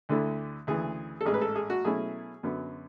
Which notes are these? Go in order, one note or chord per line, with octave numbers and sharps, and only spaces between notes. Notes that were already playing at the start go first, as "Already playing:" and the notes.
D2 D3 A3 E4
D2 C#3 E3 G#4
A4
A1 G#2 G#3 G#4
B4
A4
G#4
F#4
B2 F#3 A3 C#4 E4 G#4
F#2 D3 F#3 B3